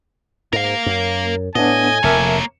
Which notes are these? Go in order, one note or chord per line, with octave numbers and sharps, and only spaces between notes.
G#2 A#4 F5
F#2
A2 B3 D4 D#5 G#5
F1 F2 A#3 A#4 C#5 E5 A5